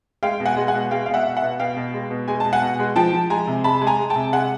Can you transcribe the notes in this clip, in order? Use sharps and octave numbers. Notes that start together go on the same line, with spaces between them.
G#3 F5 G5
B2
F#5 G#5
G#3
F#5 G#5
B2
G#3 F5 G5
B2 F5
E5 F#5
B2
E5 F#5
B2
B2 F5 G5
B2
G#3
B2
G#3 G#5
B2 A5
F#5 G#5
B2
G#3
F3 G5 A5
F3
G#3 G#5 A#5
C3
G#3 A5 B5
G#3
G#5 A#5
G#3
G5 A5
C3
G#3 F#5 G#5